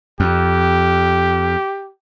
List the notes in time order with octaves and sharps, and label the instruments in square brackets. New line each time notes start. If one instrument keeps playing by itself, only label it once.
[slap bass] F2 [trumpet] G4